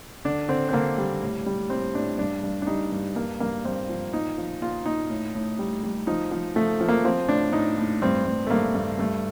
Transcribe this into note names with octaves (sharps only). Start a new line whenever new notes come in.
D3 D4
D3 C4
C4
D3 A#3
G3
A2
G3
A2 C4
A2 D4
G2 D4
G2
D4
G3 D#4
G2
G2 A#3
G2 A#3
G2 C4
F3
A#2 D#4
F3
A#2 F4
A#2 D#4
A2
A2
G3
G3
F3 D#4
F3
F3 A3
F3
A#3
F3 C4
A2 D4
A2 D#4
A2
G2 C4
G2
A3
G2 A#3
G2
G2 A3